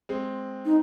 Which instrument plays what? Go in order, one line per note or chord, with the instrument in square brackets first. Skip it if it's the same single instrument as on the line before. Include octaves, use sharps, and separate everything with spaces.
[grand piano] G#3 C4
[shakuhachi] D#4